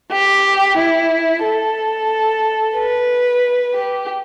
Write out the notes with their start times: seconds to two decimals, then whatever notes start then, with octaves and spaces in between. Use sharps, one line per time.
0.12 G4
0.78 E4
1.44 A4
2.76 B4
3.74 G4